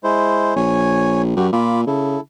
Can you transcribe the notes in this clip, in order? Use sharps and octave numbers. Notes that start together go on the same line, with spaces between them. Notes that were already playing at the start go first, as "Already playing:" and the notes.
G#3 E4 C5
A#1 C#5 G#5
F#2 F#4 G4
A#2 F4 B5 D6
C#3 E4 A4